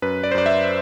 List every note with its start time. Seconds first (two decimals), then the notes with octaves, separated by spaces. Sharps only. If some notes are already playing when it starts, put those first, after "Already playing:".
0.02 F#2 B4
0.24 D5
0.32 C5
0.35 F#2 D5
0.46 E5